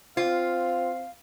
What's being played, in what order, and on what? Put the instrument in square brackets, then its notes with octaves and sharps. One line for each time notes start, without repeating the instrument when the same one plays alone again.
[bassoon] C4 [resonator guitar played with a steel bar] F4 [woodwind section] F5